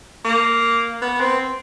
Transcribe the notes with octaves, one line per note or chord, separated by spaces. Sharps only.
A#3
B3
C4